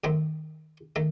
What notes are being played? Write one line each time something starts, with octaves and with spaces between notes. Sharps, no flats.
F#2 D#3 A3 C4
D#3 A3